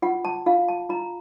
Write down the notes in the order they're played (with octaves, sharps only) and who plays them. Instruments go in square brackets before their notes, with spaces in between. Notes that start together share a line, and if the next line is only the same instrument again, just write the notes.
[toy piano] F4 F#5
A5
F4 F5
A5
F4 A#5